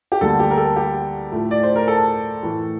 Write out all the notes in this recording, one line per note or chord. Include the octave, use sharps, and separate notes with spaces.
G4
D2 D3 G3 A#3 A4
G4
A#4
A4
G4
A2 F3 A3
D5
C5
A#4
A4
A2 E3 A3